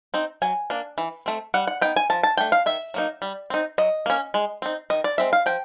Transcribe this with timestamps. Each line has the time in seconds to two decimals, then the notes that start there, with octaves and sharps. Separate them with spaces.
0.14 C4 D#4
0.42 F#3 G#5
0.70 A#3 D4
0.98 E3
1.26 A3 C4
1.54 G3 F#5
1.67 F#5
1.81 B3 D#4 G5
1.96 G#5
2.10 F3 A5
2.23 A5
2.37 A3 D4 G5
2.52 F5
2.66 D#3 E5
2.94 F#3 A#3 D#4
3.22 G3
3.50 C4 D#4
3.78 F#3 D#5
4.06 A#3 C#4
4.34 G#3
4.62 C4 D#4
4.90 D#3 D#5
5.04 D5
5.18 G#3 C4 E5
5.33 F5
5.46 F3 G5